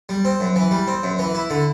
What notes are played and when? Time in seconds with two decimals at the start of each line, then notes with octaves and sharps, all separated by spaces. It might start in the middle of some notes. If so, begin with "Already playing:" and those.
0.09 G3
0.25 C4
0.40 F#2
0.56 E3
0.71 G3
0.87 C4
1.03 F#2
1.19 E3
1.35 E4
1.50 D3